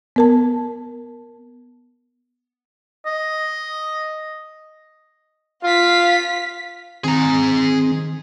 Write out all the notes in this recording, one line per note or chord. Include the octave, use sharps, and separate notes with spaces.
B3 A#4 A5
D#5
F4 F5 B6
D#3 C4 G#4 A#5